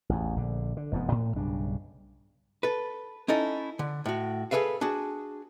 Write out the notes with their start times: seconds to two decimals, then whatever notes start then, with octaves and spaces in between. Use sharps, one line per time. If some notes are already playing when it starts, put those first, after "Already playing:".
0.09 A1 E2
0.36 A#1 D3
0.77 D3
0.92 F1 G#2 F3 B3
1.12 A2
1.36 B1 G2 C#3 D4
2.63 A4 B4
3.28 C#4 D#4 E4 A4
3.79 D3
4.06 A2 F#4
4.51 G#4 A4 B4 E5 F5
4.81 D4 F#4 G#4